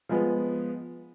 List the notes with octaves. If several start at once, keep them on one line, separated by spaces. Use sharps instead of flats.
F3 G#3 B3